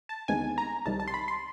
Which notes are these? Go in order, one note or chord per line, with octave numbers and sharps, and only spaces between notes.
A5
D2 C3 D#3 G#3 B3 G#5
A#5
C2 C3 D#3 G3 A5
A5
C6
B5
C6